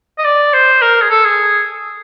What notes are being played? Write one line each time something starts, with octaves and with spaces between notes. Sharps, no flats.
D#5
D5
C5
A#4
G#4
A4
G#4